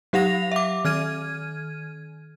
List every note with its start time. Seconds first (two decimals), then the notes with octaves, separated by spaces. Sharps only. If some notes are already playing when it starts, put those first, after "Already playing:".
0.13 F#3 G4 F5 F#5 A#6 F7
0.52 E5 D6
0.85 D#3 F6 G#6 D#7